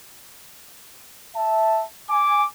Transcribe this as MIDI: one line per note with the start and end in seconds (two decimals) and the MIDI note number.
1.34 1.81 76
1.34 1.81 81
2.10 2.42 80
2.10 2.45 86